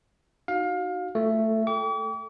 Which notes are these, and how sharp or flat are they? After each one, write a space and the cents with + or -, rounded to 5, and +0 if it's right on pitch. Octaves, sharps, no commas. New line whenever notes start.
D#4 +0 F#4 +0 F5 +25
A3 +10 F4 +0 A4 +0
A4 +0 G5 +0 D6 -45